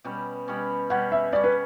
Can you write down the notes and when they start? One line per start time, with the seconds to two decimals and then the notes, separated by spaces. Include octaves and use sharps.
0.04 B2 G3 C#4
0.48 B2 G3 C#4
0.90 B2 G3 C#4 F#5
1.12 E5
1.32 B2 G3 C#4 D5
1.44 B4